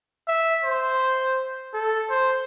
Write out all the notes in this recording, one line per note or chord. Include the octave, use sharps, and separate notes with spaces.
E5
C5
A4
C5